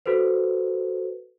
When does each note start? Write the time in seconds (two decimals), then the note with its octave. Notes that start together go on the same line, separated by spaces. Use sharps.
0.06 F#4 A4 B4 C5